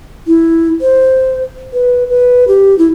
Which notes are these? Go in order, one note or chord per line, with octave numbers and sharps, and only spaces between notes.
E4
C5
B4
B4
G4
E4